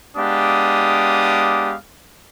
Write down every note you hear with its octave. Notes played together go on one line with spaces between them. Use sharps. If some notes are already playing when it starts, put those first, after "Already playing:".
G#3 B3 D4 G4 F5 D#6